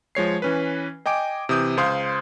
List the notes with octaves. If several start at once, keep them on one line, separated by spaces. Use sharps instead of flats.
F3 G#3 C#5 C7
E3 C#4 B4
D#5 G5 G#5 D6 D7
C3 E3 D#6 G6
C#2 C5 F5 C6 D#6 G6